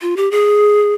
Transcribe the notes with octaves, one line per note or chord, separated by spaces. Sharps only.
F4
G4
G#4